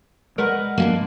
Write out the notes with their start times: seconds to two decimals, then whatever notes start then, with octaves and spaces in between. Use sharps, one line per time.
0.38 G#3 A#4 B4 F#5
0.78 A#3 C#4 D4